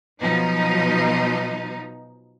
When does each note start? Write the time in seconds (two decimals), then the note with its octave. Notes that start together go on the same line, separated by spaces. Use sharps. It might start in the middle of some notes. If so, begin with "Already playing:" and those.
0.22 B2 F3 F#3 D#4